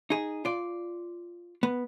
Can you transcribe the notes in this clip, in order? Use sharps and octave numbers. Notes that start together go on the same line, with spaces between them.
D#4 G#4
F4 D5
B3